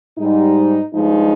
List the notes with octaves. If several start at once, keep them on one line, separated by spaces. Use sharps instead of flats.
G#2 G3 D#4
G2 F3 G#3 D#4